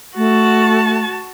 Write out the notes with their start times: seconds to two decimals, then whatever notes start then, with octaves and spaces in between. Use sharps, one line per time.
0.17 A3 F#4 A5